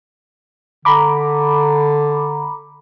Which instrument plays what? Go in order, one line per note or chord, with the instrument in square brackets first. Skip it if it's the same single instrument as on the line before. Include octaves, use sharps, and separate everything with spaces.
[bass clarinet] D3 [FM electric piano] A#5 B5 D6